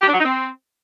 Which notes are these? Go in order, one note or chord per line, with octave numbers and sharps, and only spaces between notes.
G4
D4
F#3
D#4
C4